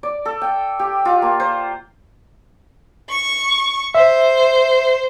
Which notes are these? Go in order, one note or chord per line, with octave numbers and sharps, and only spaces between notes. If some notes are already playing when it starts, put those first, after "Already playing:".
D5
A4
G5
G4
F4
A#3
C5
C#6
C5 E5